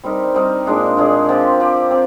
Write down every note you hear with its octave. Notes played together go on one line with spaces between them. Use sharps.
G3 C4 D#4 A#4
G3 C4 D#4 A#4
A#2 G#3 D4 G#4
A#2 G#3 D4 G#4
F3 C4 G4
F3 C4 G4
C4